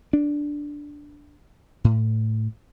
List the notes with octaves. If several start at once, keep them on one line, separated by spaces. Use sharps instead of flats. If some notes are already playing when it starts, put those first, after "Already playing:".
D4
A2